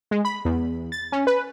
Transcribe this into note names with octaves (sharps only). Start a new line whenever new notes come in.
G#3
B5
E2
A6
C#4
B4